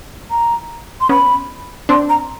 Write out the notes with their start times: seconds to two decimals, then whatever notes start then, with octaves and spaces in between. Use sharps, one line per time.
0.31 A#5
1.01 C6
1.09 B3 C#4 B5
1.89 C4 D4 C6
2.09 A#5